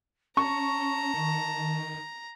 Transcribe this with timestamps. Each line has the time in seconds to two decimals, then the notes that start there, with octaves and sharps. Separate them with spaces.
0.37 C#4 A5 A#5 C#6
1.14 D#3